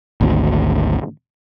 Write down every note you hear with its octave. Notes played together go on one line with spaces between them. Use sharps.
G#1 D2